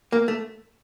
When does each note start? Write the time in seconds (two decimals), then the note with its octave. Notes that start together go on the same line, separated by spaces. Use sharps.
0.12 A#3
0.28 A3